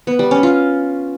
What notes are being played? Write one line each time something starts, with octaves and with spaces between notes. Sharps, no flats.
B3
G3
C#4
F4